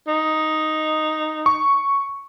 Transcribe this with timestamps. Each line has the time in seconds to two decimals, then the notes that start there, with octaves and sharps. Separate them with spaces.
0.08 D#4
1.46 C#6